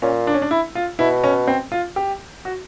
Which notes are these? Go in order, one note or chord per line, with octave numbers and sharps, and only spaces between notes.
A#2 C#4
D4
C#4
D4
E4
F4
B2 E4
C#4
C4
F4
G4
F#4